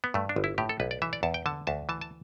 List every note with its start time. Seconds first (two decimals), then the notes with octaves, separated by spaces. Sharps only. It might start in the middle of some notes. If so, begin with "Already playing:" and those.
0.04 B3
0.14 G2 A3
0.29 D4
0.36 G1
0.44 E4
0.58 A2 G4
0.69 A4
0.80 B1 B4
0.91 D5
1.02 E3 E5
1.13 D5
1.23 E2 A5
1.34 G5
1.46 D3 A5
1.67 D2 A5
1.89 E3 A5
2.01 A5